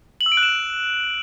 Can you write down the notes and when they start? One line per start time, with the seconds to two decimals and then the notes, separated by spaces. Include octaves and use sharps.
0.21 F#7
0.26 E6
0.32 D7
0.37 F#6
0.43 E7